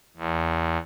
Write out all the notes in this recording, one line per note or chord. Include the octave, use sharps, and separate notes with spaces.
E2